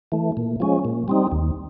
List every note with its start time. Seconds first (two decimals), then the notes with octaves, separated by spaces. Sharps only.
0.12 E3 A3
0.37 A#2
0.60 F3 G#3 C#4
0.85 A#2
1.08 G3 C4 D#4
1.32 D#2